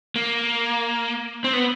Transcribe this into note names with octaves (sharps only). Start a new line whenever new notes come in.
A#3
C4
B3